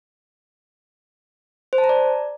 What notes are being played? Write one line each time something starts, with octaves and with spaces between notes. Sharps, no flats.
C5
A5
A#5
D5